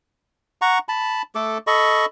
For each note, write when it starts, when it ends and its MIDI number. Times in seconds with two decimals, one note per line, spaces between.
0.62 0.78 78
0.62 0.78 82
0.62 0.78 85
0.89 1.22 81
0.89 1.22 83
1.35 1.58 57
1.35 1.58 69
1.35 1.58 86
1.67 2.05 69
1.67 2.05 75
1.67 2.05 83
1.67 2.05 85